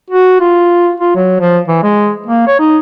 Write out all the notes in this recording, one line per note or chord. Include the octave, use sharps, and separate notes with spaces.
F#4
F4
F4
F#3
F3
E3
G#3
A#3
C#5
D#4